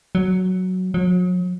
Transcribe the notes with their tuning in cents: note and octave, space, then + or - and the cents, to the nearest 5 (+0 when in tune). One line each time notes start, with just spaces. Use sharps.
F#3 +0
F#3 -40